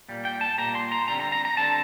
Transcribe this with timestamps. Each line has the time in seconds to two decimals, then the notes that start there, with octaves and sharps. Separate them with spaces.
0.08 A#2 G3 A#3
0.25 G5
0.41 A5
0.58 A#2 G3 A#3 A#5
0.75 C6
0.92 A#5
1.08 D3 G3 C4 A#5
1.20 A#5
1.32 A#5
1.45 A#5
1.57 D3 G3 C4 A5